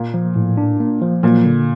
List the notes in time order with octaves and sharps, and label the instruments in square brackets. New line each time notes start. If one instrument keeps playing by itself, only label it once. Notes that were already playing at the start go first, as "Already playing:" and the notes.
Already playing: [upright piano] A#2 [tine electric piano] A#3
[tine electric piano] F3
A2
D4
A#3
F3
[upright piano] A#2 [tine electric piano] F#3
[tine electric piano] D3